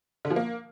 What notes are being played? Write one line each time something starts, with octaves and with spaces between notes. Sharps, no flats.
D3
F3
A#3